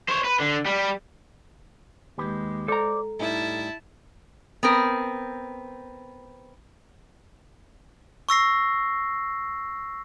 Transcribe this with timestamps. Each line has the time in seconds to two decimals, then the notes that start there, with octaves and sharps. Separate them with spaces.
0.08 C5 C#5
0.24 B4
0.39 D3
0.66 G3
2.18 D#2 G#3 G4 B4
2.68 A4 C5 D5 A#5
3.19 A2 G3 D#4 E4 A5
4.63 B3 C4 A#4
8.29 C#6 E6 A#6 C7